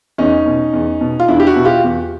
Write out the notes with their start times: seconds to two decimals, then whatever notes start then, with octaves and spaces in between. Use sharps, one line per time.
0.18 E2 C#4 D#4
0.46 B2
0.73 E2
1.01 B2
1.20 F4
1.28 E2 D4 E4
1.40 G4
1.47 E4 F#4
1.56 B2
1.65 F4 G4
1.84 E2